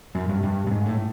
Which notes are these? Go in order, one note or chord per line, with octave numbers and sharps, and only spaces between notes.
F#2
G2
G2
G2
G#2
A2